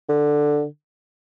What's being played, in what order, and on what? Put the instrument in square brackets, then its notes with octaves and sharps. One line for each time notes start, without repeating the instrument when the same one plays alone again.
[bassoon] D3